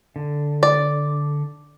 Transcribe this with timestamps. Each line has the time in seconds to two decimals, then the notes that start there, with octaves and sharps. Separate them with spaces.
0.16 D3
0.63 D5